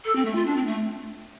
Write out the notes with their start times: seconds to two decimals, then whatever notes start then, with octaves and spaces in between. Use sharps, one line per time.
0.05 A4
0.16 C4
0.25 A3
0.35 F4
0.46 D4
0.56 C4
0.67 A3